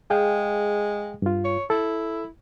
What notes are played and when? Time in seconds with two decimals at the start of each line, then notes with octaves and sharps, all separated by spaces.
0.10 G#3 G#4 F5 G5
1.22 G2 F4
1.45 C#5
1.70 E4 A4